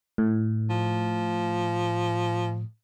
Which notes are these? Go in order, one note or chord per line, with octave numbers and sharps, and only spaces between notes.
A2
F3